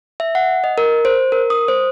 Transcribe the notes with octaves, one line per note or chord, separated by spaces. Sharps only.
E5
F#5
D#5
A#4
C5
A#4
D#6
C5